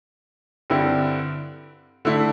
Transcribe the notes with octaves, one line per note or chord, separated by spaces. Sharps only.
G2 D3 C4 E4
D3 A3 E4